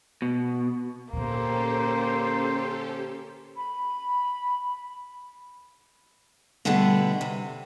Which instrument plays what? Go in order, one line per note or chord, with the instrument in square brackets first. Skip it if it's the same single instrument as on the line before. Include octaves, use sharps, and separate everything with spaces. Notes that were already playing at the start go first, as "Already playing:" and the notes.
[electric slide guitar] B2
[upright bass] A#2 D3 [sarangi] A#3 [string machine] C#4 G4 A4 [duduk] C5
[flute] B5
[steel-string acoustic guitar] B2 D3 G3 A3 B3
C3